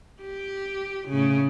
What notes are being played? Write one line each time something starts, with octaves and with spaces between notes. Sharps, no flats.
G4
A2 C#3